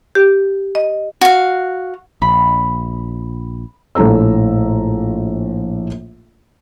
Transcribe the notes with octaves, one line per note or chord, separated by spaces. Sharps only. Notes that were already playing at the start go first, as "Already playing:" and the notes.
G4
D#5
F#4 F5
A#1 B5
A#1 A2 A4 A#5 E6